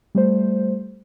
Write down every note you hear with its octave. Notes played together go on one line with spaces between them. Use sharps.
G3 A3 C5